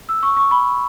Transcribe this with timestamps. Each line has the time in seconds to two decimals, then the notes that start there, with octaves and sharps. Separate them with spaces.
0.09 E6
0.23 C#6
0.36 C#6
0.51 B5